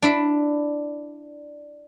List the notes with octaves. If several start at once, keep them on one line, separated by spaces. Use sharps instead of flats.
D4 E4 E5